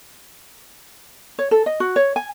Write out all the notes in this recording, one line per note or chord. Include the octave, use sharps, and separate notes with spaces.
C#5
A4
D#5
F#4
C#5
G#5